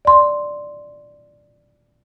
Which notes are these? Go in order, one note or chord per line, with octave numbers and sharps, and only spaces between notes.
D5 C6